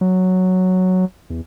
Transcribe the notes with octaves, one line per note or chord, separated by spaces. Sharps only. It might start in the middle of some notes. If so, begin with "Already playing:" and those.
F#3
E2